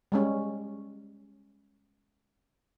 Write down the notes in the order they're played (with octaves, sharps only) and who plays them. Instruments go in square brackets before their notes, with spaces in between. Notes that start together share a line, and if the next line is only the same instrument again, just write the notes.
[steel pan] G3 G#3 C#4